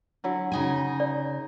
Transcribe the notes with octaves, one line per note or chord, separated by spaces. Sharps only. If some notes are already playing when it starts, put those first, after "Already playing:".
D3 F#3 E4
C#3 D#4 G#5
D5